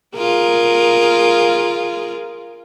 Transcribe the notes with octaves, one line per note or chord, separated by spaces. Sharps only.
F4 G#4 A#4